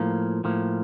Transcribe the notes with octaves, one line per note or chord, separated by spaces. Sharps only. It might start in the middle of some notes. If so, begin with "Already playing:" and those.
Already playing: A2 F3 A#3
A2 F3 A#3